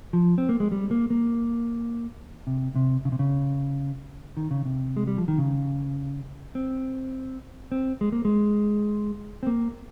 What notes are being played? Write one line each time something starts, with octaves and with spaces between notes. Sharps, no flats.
F3
C4
A#3
G#3
G3
A#3
A#3
C3
C3
C#3
C3
C#3
D#3
C#3
C3
G#3
G3
F3
D#3
C#3
C4
C4
G#3
A#3
G#3
C4
A#3